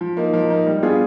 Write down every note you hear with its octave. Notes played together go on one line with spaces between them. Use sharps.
F3
A#3 D#4
F3
A#3 D#4
G3
B3 D4 F4 G#4